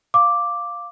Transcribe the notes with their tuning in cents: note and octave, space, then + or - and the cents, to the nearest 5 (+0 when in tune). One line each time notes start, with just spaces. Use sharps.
F5 +0 D6 +0